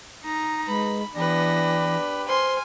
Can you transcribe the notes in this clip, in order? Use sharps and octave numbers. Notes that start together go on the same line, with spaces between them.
D#4 A#5
G#3 B4 B5
E3 B3 D4 G4 B4 A#6
C5 G#5 C6 F6